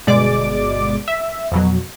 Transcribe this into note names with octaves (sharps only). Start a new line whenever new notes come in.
G1 B2 G#3 D5 D6
E5
F2 B2 F#3